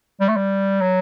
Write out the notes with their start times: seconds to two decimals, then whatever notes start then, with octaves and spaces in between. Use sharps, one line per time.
0.21 G3
0.28 A3
0.36 G3
0.81 F#3